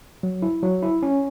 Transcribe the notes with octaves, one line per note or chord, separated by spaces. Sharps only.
F#3
E4
F#3
E4
C#4